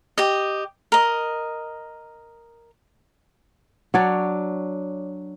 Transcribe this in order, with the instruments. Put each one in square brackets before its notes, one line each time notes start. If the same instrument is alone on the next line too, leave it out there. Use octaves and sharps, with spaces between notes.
[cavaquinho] G4 D#5
A#4 D#5
[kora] F#3 D4 C#5 D5